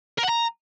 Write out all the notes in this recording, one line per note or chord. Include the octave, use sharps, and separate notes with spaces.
A#4
F#5
A#5